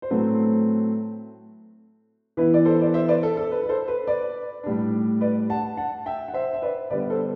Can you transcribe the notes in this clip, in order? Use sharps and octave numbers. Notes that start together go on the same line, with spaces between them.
C5
A2 F#3 A3 C4 B4
E3 B3 E4 B4
D5
A4 C5
D5
C5 E5
B4 D5
A4
A4
B4
B4
A4 C5
B4
B4 D5
A2 G3 D4
B4 D5
F#5 A5
F#5 A5
E5 G5
F#5
C5 E5
E5
B4 D5
D3 G3 B3 B4 D5
A4 C5